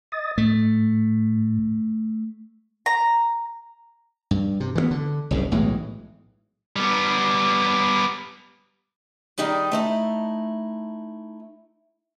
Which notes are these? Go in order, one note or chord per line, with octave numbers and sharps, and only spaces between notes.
D#5 D#6 A6
A2 A3
A#5
G2
C3
E3 F#3 B3
D3
F#1 C2 G#2
B1 A2 E3 G#3
G3 B3
D#3 G3 D#4 G4 G#4
A3 D#4 E4